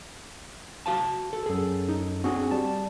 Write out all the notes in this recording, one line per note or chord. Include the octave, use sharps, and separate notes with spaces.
F#4 F5 A5
A4
F#2 G#4 A4
D#4
C4 D4 F#4 G#4
G3 A5